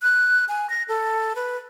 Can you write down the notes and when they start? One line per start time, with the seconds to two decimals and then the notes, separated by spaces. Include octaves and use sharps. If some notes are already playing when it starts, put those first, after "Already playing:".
0.02 F#6
0.49 G#5
0.70 A#6
0.89 A4
1.36 B4